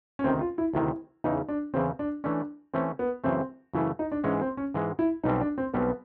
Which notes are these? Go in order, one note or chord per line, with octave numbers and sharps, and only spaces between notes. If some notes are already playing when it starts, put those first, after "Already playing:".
C#4
D2 C3 D#3 C4
F4
E4
D2 C3 D#3 E4
E2 C#3 E3 D#4
D4
E2 C#3 E3 C4
D4
E3 A3 C#4 D4
E3 A3 C4 C#4
B3
F#2 C#3 E3 A3 C4
F#2 C#3 E3 A3 E4
D#4
D4
G#2 E3 G#3 C#4
C4
C#4
G#2 E3 G#3
E4
B1 B2 G3 C4 D#4
D4
C4
B1 B2 G3 B3 C4